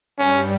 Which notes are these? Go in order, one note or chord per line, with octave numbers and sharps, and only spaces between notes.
G2 G3 C#4